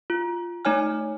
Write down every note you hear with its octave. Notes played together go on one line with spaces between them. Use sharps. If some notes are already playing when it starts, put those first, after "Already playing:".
F4
A3 D#4 C#5 G#5 F6